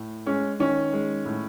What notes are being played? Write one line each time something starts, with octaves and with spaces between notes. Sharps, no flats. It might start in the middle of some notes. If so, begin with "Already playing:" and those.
Already playing: A2
G#3 C#4
D#3 C#4
G#3
A2